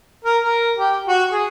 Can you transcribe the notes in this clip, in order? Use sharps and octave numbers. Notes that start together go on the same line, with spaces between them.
A#4
A#4
G4
F#4
G#4